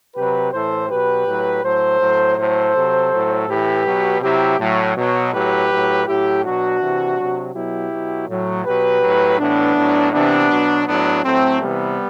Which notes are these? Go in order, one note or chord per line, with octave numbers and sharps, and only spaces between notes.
C3 F#3 G4 B4
A2 E3 A4 C5
B2 F#3 G4 B4
A2 F#3
A2 F#3 A4 C5
A2 F#3
A2 F#3 A4 C5
C3 F#3
A2 F#3
A2 E3 G4 B4
B2 F#3
C3 F#3 E4 G4
A2 F#3
B2 F#3
A2 F#3 G4 B4
A2 F#3
A2 F#3 E4 G4
B2 F#3 D4 F#4
C3 E3
C3 F#3
B2 F#3 E4 G4
B2 F#3
A2 F#3
B2 F#3 G4 B4
A2 F#3
A2 E3 B3 D4
A2 F#3
C3 E3 B3 D4
B2 F#3
A2 F#3 B3 D4
A2 F#3 A3 C4
C3 E3 G3 B3